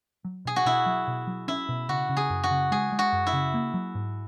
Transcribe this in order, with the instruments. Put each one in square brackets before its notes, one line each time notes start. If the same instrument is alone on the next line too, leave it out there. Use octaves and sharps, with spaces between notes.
[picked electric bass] F#3
[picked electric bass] B2 [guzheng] G#4
[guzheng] F#4
[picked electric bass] B2 [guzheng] E4
[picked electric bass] F#3
B2
F#3
[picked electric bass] C#4 [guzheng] E4
[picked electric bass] B2
[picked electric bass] C#3 [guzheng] F#4
[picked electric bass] C#3
[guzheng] G#4
[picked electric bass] F#2
[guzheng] F#4
[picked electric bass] C#3
[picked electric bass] G#3 [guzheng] G#4
[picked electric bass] G#3
[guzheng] F#4
[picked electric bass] F#2
[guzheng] E4
[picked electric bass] C#3
A#3
F#3
G#2